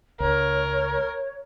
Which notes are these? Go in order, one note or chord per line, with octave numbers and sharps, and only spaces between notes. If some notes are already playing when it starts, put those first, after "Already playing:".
C#2 A#4 C#5